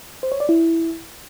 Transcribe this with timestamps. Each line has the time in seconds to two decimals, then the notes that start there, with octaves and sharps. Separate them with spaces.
0.23 C5
0.32 C#5
0.40 D5
0.49 E4